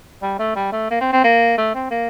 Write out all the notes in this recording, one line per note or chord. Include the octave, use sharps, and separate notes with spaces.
G3
A3
G3
A3
A#3
C4
C4
A#3
A3
C4
A#3